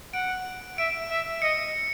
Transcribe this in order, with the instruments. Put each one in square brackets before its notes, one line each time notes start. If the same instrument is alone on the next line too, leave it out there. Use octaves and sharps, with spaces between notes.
[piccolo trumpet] F#5 [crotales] D7
[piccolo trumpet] E5 [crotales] D7
[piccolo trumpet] E5
[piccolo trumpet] D#5 [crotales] C#7